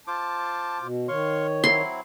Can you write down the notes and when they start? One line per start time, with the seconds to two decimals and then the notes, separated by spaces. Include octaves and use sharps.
0.07 F4 C5 A5 D6
0.81 B2
1.08 D#3 C#5 F5 C6 C#6
1.64 F#3 C4 E4 C6